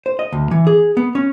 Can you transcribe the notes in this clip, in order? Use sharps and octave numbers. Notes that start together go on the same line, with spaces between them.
C5
D#5
D2
E3
G#4
B3
C#4